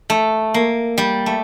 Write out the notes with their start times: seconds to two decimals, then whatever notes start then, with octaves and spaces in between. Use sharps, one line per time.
0.10 A3
0.54 A#3
0.98 G3
1.26 A3